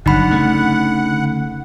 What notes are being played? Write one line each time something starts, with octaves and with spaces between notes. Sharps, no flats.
G1 D3 F#3 D#4 F#5 B5
C#3 A3